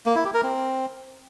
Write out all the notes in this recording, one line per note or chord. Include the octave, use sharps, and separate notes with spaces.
A#3
E4
G4
A#4
C4